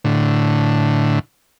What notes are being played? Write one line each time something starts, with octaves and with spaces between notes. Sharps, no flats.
A2 D3